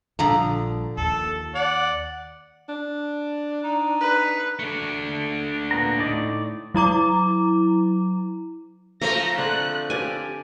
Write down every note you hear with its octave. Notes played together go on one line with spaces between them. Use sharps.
A#1 D3 F3 G3 A#5
D#2 A4
D5 F#5
D4
D#4
B4
A3 D4
A#2 B3 A#5
A2 D#4 D5
F#3 E4 A#5 D6
F3 A3 A#5 A#6
D3 C4 F#6
G4 D5 G#5